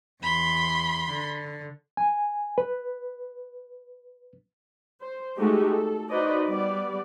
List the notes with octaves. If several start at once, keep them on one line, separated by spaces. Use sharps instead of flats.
E2 B5 C6
D3
G#5
B4
C5
G#3 A3 D#4 F#4 G4 A4
A4
D#4 F#4 B4 C5 D5 D#5
G3 B3 D5